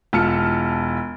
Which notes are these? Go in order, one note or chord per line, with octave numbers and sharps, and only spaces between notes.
E1 F4 A5 F6 C#7